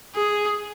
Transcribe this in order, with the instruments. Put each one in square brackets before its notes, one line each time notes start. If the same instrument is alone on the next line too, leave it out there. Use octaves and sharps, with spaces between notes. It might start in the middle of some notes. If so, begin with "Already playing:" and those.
[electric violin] G#4